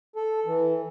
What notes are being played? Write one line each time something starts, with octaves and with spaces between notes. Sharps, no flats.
A4
E3